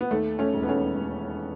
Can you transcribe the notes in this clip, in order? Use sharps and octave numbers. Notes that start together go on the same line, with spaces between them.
B3
D#2 A3
A3 C#4
E1
B3
A3 C#4
E1